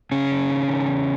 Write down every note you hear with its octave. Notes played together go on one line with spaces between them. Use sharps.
F#2 C#3 C#4
F#2
D#3
D#3
E2